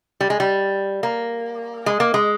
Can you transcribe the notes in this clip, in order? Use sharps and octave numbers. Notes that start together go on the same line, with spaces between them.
G3
G#3
G3
A#3
G#3
A#3
G#3